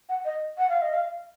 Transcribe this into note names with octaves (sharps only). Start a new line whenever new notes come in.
F#5
D#5
F#5
F5
D#5
F5